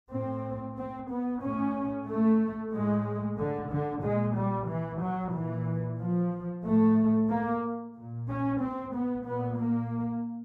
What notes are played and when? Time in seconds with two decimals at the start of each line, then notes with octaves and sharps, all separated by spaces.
0.11 A2 C4
0.77 C4
1.10 B3
1.42 A2 C#4
2.08 A3
2.72 A2 G#3
3.39 D3
3.71 D3
4.03 A#2 G#3
4.36 G3
4.69 E3
5.02 F#3
5.34 A#2 E3
6.00 F3
6.65 A2 A3
7.29 A#3
7.96 A#2
8.29 C#4
8.61 C4
8.94 B3
9.26 A#2 B3
9.59 A#3